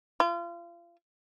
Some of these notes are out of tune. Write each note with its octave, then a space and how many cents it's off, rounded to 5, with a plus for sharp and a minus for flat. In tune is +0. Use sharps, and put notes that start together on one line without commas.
F4 -35